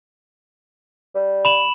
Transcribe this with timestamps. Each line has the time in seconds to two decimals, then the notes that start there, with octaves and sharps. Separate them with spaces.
1.15 G3
1.45 B5 E7 F#7